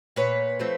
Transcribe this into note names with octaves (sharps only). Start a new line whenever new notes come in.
A#2 B4 C#5
F3 A3 C4